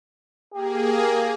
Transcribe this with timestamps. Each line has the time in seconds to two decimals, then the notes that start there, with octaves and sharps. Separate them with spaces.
0.54 A#3 G4 G#4